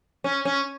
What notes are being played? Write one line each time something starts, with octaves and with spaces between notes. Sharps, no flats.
C#4
C#4